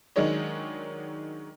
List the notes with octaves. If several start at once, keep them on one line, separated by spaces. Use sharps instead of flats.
D#3 F#3 G#3 D4 C#5 D#5